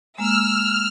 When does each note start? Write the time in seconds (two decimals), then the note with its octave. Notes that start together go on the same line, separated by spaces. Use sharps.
0.18 G#3 A#3 E6 F6